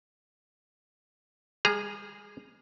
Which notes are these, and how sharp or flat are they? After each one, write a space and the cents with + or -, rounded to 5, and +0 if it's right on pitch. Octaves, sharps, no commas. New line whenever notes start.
G3 +45 G#4 +0 A#5 +0